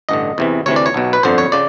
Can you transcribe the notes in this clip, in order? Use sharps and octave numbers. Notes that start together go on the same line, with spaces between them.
A1 G2 D3 D#5
E2 C3 E3
D2 C3 E3 C#5
D5
C#5
B1 B2
B4
G1 F2 D3 C5
C#5
C#3 D5